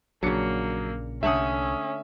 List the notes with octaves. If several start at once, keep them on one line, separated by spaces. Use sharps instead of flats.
A#1 A#2 C#3 F#3 A#3 D4 C#7
C2 D3 A3 C#4 E5 F#5 D#6